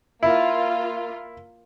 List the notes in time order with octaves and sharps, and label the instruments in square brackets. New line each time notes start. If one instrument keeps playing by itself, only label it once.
[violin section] A#3 F4 F5 [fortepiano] E4